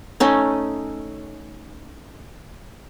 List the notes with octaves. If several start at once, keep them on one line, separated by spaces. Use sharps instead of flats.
A3 C#4 D#4